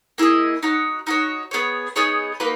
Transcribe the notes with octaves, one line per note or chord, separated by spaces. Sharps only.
A#3 E4 G#4 D#5
D#4 F#4 C#5
D#4 F#4 C#5
B3 D#4 G#4 C#5
B3 D#4 G#4 C#5
A#3 D#4 F#4 B4